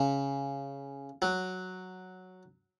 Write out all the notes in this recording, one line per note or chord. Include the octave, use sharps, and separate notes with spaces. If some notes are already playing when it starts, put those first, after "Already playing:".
Already playing: C#3
F#3